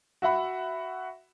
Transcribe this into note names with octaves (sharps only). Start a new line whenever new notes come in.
F#4 E5 F#5 B5